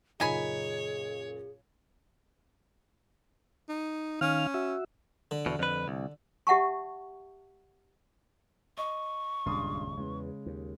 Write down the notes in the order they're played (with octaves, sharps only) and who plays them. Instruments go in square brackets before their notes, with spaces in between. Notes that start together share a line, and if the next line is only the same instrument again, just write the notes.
[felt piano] F#2 A#2 C#3 [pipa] D#4 G#5 B5 [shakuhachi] G#4 [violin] C#5
[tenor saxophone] D#4
[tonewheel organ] D#3 F5 F6 [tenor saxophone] C#4
[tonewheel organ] F#4 E5
[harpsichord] D3
[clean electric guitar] E2 B2
F2 B4
C2
[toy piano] G4 E5 F#5 A5 C#6
[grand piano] D#5 [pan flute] C#6
[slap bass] D#1 C#2 C#3 [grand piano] G2 C6 D#6
[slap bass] E2 [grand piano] C#3 G#3
[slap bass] D#2